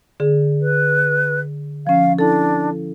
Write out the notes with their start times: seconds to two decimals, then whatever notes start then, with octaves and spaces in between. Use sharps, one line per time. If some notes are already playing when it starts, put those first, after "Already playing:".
0.20 D3 G#4
0.61 B4
1.87 F3 C#4 F5
2.19 D4 E4 A4